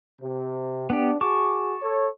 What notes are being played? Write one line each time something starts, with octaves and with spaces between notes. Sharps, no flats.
C3
B3 D4 G4
F#4 G#4 A5 C#6 D6
A4 C#5